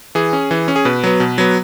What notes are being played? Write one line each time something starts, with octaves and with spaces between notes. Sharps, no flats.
E3 G#4
C#4
E3
C#4
G#4
B2 B4
F#3 B3
B2
F#3 B3